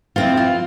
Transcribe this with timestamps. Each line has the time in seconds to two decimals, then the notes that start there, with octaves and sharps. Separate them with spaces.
0.16 F3 C4 E4 F4
0.37 F4